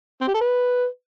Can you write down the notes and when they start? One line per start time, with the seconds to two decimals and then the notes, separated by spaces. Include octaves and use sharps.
0.21 C4
0.28 G4
0.34 A4
0.41 B4